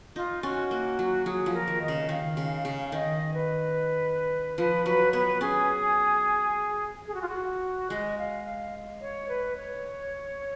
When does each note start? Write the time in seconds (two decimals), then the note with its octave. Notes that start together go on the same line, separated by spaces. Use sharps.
0.15 D#4 F4
0.42 C#4 F#4
0.71 A#3
0.99 F#3
1.25 F#3 G#4
1.46 F3
1.54 A#4
1.68 D#3
1.82 D#5
1.88 C#3
2.09 D#3 F5
2.37 C#3
2.65 C#3
2.92 D#3 D#5
3.34 B4
4.58 F3 B4
4.86 F#3 B4
5.13 B3 B4
5.41 C#4 G#4
7.08 G#4
7.14 F#4
7.22 F4
7.28 F#4
7.90 G#3 D#5
8.18 F5
8.45 F5
9.01 C#5
9.29 B4
9.57 C#5